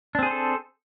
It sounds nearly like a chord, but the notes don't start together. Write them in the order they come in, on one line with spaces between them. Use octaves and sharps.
D4 C4 G#4 C5 A4